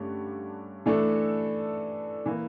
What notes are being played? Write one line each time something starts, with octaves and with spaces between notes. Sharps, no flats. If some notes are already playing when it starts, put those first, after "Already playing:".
Already playing: G2 D3 A3 C#4 G4
E3 A3 D4 A4
E3 A#3